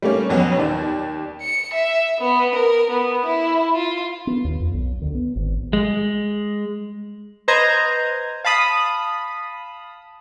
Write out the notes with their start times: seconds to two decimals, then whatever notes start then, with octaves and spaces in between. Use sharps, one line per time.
0.02 G3 A3 A#3 C#4
0.29 F2 F#3 B3 C#4
0.57 D#2 D5
1.41 C#7
1.73 E5
2.20 B3
2.55 A#4
2.90 B3
3.25 E4
3.74 F4
4.27 B3
4.44 D#2
4.60 F2
4.74 B1
5.01 D2
5.14 B3
5.36 G#1
5.73 G#3
7.48 B4 C5 D#5 A#5 G#6
8.45 F5 A5 B5 D#6